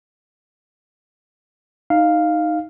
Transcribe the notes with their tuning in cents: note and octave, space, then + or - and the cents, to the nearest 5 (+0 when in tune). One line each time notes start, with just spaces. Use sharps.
D#4 +0 F5 +0